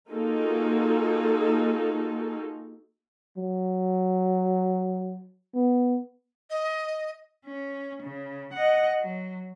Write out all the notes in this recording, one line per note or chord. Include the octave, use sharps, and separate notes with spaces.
A#3 D#4 F4 F#4 G#4 A4
F#3
B3
D#5
C#4
C#3
D#5 F#5
F#3